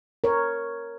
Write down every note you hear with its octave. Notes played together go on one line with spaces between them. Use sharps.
A#4 C#5